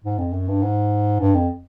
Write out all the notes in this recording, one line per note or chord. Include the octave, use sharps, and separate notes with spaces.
G#2
F2
F#2
G2
G#2
G2
F2